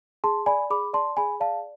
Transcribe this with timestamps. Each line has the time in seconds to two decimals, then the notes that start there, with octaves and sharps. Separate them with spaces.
0.24 G#4 A5 C6
0.46 D5 G#5 B5
0.70 G#4 B5 D6
0.93 D5 A5 C6
1.17 G#4 G#5 B5
1.40 D5 F5 A5